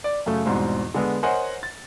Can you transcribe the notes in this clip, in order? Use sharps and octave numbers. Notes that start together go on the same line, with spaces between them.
D5
F#2 C#3 A3
E2 G#2 B2 G3 C4
D3 G#3 B3
A#4 C5 C#5 D#5 F#5 G#5
A6